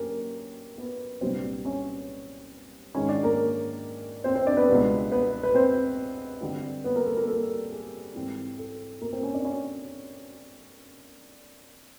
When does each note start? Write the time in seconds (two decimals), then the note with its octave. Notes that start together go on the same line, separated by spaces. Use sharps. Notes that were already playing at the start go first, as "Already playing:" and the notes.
Already playing: F#2 A#3 B3 C#4 D4 G4 A#4 C#5
0.78 B3 B4
1.21 C2 A#2 G3 B3 C4 D4 C5
1.65 C#4 C#5
2.94 G#2 D#3 G#3 C#4 C#5
3.09 D4 D5
3.23 A#3 A#4
4.24 C4 C5
4.35 C4 C5
4.47 D4 D5
4.57 B3 B4
4.68 C#2 B2 G3 B3 D4
5.12 B3 B4
5.43 B4
5.54 C4 C5
6.41 G2 D3 G3 C4
6.84 B3 B4
6.96 A#3 A#4
7.06 A4
7.17 A#3 A#4
7.28 A4
7.71 G#4
8.14 G#2 E3 G3 C4
8.58 A4
9.01 A#3 A#4
9.13 C4 C5
9.23 C#4 C#5
9.33 D4 D5
9.44 C#4 C#5